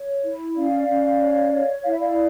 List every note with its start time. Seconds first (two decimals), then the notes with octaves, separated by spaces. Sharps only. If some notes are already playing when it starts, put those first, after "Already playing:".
Already playing: C#5
0.24 E4
0.56 C#4 D5 F5
0.89 C#4
1.21 C#5
1.53 C#5
1.85 E4 F5
1.93 E5
2.00 D5 F5